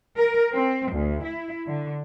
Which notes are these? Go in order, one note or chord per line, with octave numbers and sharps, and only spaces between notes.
A#4
C4
D2
E4
D3